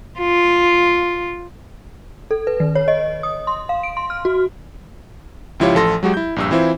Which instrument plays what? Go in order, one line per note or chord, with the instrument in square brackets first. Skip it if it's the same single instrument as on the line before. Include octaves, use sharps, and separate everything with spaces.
[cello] F4
[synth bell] A4
B4
D#3
C#5
D#5
D#6
C6
F5
D7
C6
F6
F#4
[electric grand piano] C#2 F3 E4 F4 G4 C#5
A1 F3 A4 C6 A#6
F#3 G#3 F#4 G4
E4 G6
A#1 G2 E6
E3 C4 E4 F4 C5